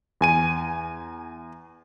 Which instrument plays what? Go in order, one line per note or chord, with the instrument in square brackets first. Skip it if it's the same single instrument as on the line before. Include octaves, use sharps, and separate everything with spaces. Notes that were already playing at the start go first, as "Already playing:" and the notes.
[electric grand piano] E2 G#5 D#7